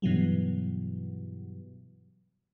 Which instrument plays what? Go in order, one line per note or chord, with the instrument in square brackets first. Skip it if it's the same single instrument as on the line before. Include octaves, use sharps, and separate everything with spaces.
[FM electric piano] G2 B2 E3 F#3 G3